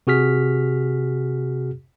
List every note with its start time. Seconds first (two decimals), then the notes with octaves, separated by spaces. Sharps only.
0.07 C3 F#4 G#4 F6 B6